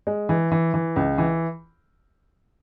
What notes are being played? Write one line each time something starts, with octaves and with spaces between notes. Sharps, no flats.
G#3
E3
E3
E3
C#2
E3